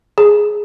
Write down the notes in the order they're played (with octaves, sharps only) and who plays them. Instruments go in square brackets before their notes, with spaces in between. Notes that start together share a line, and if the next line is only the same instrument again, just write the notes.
[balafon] G#4